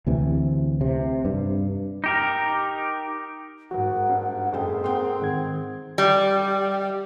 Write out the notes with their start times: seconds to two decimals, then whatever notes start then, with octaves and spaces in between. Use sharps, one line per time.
0.07 D2 C3 E3
0.81 C3
1.25 G2
2.04 D#4 G4 A#4
3.71 G#2 F#4 A#4 F#5
4.09 G2
4.53 F#1 G#4 A4 G5
4.84 C4 A#4 F#5 G5 C6
5.20 G#2 D#3 G#6
5.98 G3